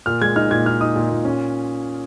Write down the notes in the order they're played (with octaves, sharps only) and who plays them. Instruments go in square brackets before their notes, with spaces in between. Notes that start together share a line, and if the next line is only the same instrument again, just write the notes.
[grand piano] A#2 F6
G#3 G#6
D#4 F6
A#2 G#6
D#4 F6
D#4 D#6
A#2
A#2
C#4